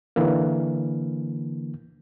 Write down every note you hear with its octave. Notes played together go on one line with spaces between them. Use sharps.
D3 E3 A#3